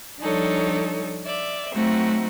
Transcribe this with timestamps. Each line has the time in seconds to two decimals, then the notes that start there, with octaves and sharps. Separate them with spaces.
0.20 F3 G3 D4 D#4 A4 C#5
1.24 D5 E5
1.73 F#3 A3 C4 D#4 F#4